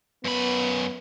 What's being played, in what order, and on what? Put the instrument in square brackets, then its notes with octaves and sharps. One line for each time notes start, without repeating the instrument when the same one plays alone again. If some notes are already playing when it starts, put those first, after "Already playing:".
[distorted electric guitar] F#2 B5 [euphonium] B3